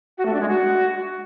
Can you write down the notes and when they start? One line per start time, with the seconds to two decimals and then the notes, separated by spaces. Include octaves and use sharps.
0.18 F#4
0.26 A3
0.33 D4
0.41 G#3
0.48 F#4